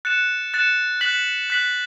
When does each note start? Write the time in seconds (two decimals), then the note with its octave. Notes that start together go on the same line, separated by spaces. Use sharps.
0.05 F#6 A6 C#7 E7
0.54 F#6 A6 C#7 E7
1.01 F#6 B6 F#7
1.50 F#6 B6 F#7